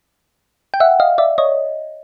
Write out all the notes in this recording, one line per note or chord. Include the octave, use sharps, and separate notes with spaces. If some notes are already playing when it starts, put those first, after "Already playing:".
G5
E5 F#5
D#5 F5
D5 E5
C#5 D#5